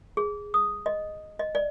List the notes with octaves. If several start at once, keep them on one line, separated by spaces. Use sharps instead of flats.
G#4
D#6
D#5
D#5
D5